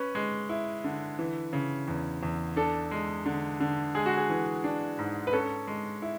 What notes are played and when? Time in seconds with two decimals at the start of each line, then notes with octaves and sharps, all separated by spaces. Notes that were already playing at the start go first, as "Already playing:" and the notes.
Already playing: C#4 B4
0.15 G#3
0.49 E4
0.84 D3
1.19 E3
1.53 C#3
1.88 E2
2.23 E2
2.56 D4 A4
2.91 G#3
3.26 D3
3.60 D3
3.95 G#3 G#4
4.06 F#4
4.17 G#4
4.30 E3
4.64 D4
4.98 G#2
5.27 B4
5.33 C#4 A4
5.67 G#3
6.02 E4